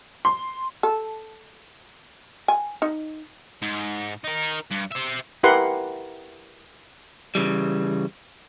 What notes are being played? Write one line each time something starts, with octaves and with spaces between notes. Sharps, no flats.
C6
A4
G#5
D#4
G#2
D#4 A#4
G2
C5 E5
E4 G4 A#4 B4 F#5 C6
C#3 E3 G3